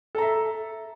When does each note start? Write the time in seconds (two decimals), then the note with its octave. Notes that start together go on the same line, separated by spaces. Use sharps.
0.15 A4
0.18 A#5
0.22 E5